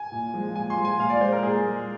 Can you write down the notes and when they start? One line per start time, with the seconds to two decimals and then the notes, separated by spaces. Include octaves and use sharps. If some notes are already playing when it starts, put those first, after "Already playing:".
Already playing: G#5
0.12 A#2
0.34 F3 G#3
0.56 A#2 G#5
0.70 C6
0.78 F3 G#3
0.85 G#5
1.00 A#2 F5
1.10 D5
1.21 G#3 C5
1.32 A#4
1.43 A#2 G#4
1.65 G#3